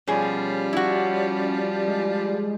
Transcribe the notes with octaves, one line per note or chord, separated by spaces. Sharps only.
B2 F3 G3 C#4 G#4
E4 F#4
G#3